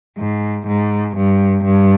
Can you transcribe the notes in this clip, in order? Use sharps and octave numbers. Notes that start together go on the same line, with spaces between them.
G#2
G#2
G2
G2